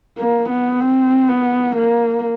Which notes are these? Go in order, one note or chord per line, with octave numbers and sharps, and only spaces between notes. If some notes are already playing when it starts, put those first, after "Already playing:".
A#3
B3
C4
B3
A#3